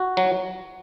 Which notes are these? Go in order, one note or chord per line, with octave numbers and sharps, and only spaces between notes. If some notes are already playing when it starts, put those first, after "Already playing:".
Already playing: F#4
F#3